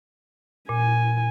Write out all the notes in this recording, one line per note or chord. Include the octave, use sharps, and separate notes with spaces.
A#2 G#5